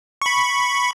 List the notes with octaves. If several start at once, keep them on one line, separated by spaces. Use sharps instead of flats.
B5 C#6